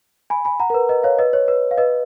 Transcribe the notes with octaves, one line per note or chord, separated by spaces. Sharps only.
G#5 B5
G#5 B5
F#5 A#5
A#4
B4
B4 D#5
C#5 F5
B4 D#5
C#5
B4
F5
B4 D#5